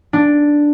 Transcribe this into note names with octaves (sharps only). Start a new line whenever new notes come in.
D4